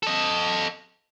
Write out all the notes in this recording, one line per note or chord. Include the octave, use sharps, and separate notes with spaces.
A4 D#5